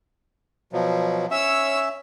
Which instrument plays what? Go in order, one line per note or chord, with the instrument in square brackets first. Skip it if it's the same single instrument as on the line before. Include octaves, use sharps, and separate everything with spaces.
[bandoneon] B2 F3 F#3
[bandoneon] C#4 E5 [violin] C#5 E6